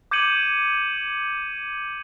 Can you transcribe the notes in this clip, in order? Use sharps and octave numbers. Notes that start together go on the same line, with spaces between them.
D6 G6 G#6 C#7 D#7 F#7